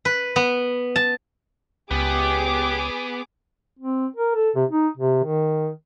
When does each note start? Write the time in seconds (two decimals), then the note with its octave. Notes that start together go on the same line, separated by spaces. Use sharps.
0.05 B4
0.36 B3
0.96 A5
1.91 C#2 B3 G4 G#4 D6
3.79 C4
4.16 A#4
4.35 A4
4.55 C3
4.70 D#4
4.97 C3
5.23 D#3